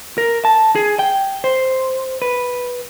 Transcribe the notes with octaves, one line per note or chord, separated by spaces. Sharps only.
A#4
A5
G#4
G5
C5
B4